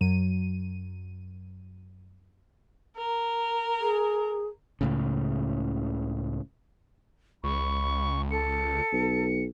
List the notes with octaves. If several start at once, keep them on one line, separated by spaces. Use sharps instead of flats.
F#2 F#3 D#7
A#4
G#4
C#2 A2 C#3
C#2 B5 C#6
A4 C#7
B1